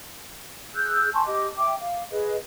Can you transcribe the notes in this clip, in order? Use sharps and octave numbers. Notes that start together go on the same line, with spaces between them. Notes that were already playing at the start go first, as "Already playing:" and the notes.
G#4 E6 F#6 G6
G#5 A5 C6 C#6
G4 D#5 D6
E5 G5 D6
F5
G#4 B4 D#5